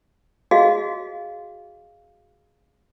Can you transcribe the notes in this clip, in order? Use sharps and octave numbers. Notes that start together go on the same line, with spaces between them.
F#4 G#4 D#5 F5